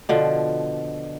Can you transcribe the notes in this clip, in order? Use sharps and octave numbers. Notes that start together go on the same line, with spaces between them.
B2 D3 F3